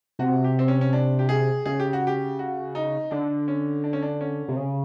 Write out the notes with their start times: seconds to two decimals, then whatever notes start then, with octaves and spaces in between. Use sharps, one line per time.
0.19 C3 F#4
0.44 G4
0.59 C4
0.68 C#4
0.81 C#4
0.93 D4
1.19 G4
1.29 G#4
1.66 C#3 G#4
1.80 G4
1.93 F#4
2.07 G4
2.39 F#4
2.75 D#4
3.11 D3 D4
3.48 C#4
3.84 D4
3.93 C#4
4.02 D4
4.21 C#4
4.48 C3
4.57 C#3